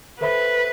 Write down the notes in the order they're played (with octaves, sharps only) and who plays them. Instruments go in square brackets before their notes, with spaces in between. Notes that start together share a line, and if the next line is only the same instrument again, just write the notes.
[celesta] A4 C5 E5 B5 [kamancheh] B4